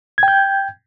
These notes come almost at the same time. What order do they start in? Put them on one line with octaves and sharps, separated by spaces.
G#6 G5 G6